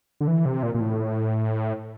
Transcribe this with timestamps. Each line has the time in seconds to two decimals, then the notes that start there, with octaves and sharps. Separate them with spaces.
0.21 D3
0.27 E3
0.45 C3
0.63 A#2
0.74 A#2
0.81 A2